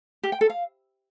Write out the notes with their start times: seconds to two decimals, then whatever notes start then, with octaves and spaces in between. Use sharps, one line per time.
0.23 G4
0.32 G5
0.41 A4
0.50 F5